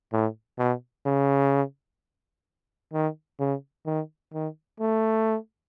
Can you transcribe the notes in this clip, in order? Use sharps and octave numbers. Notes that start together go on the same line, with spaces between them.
A2
B2
C#3
D#3
C#3
D#3
D#3
A3